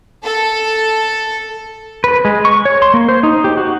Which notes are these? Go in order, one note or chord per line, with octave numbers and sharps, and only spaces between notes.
A4
B4
G#3
C#6
C#5
C6
A#3
C5
D#4
G4
F#4